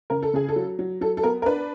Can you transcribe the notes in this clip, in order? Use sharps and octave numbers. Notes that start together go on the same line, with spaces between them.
C#3 A#4
A4
C#3 G#4
A4
F#3
F#3
F#3 A4
A4
B3 A#4
A#4
D4 B4